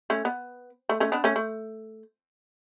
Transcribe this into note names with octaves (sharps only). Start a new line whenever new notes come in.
A3 C#4
B3
A3
A3 C#4
B3 D4
A3 C#4
A3